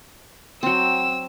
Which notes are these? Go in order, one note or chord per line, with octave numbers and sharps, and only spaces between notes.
F#3 C4 E6